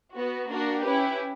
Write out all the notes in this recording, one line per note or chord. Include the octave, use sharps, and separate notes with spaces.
B3 F#4
A#3 D4 F#4 A#4
C#4 E4 G4 B4